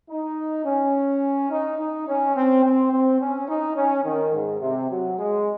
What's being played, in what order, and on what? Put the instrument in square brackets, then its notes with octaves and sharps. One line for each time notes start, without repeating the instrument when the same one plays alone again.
[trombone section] D#4
C#4
D#4
D#4
C#4
C4
C4
C4
C#4
D#4
C#4
D#3
G#2
C3
F#3
G#3